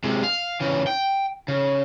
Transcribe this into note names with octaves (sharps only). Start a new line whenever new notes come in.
C3 G#3
F5
C#3 E3
G5
C#3